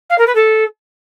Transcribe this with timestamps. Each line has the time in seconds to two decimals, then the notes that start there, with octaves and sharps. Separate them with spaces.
0.10 F5
0.18 A#4
0.27 B4
0.35 A4